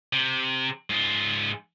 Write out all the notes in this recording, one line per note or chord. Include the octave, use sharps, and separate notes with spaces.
C3
G#2 F4